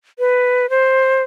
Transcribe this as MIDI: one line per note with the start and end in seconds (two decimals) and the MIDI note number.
0.19 0.70 71
0.70 1.23 72